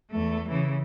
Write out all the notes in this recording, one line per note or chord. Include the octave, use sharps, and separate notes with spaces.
E2 A3
C#3 E3